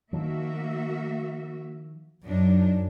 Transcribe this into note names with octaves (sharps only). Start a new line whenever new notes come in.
D#3 F3 A#3 F#4 E5
F#2 F#3 D4 D#4